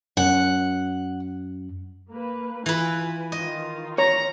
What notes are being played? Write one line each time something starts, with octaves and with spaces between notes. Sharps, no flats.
F#2 F#5
A#3 B4
E3 F4 B4 G#5
D#3 F4 D#5
C#5 A#5